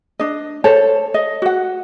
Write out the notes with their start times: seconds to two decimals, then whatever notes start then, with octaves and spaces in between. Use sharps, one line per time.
0.19 D4 D#5
0.64 A4 C5 C#5 A5
1.14 D#5
1.42 F#4 F#5